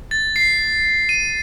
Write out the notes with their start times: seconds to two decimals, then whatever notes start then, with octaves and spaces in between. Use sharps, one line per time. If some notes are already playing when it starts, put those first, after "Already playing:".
0.11 A6
0.36 C7
1.09 D#7